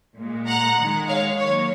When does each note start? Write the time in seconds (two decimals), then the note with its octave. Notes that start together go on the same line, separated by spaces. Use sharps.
0.18 A#2 G#3
0.47 F#5 A#5
0.78 D#3 G#3
1.08 C#5 F5
1.38 D#3 F#3 A#3 C#5